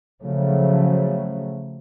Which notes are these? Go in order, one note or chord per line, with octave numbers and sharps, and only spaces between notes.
C#3 F3 F#3 A3